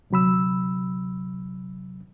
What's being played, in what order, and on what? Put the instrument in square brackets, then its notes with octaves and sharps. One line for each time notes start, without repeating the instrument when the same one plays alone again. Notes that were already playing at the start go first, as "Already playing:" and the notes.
[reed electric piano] D2 C3 F#3 B5 E6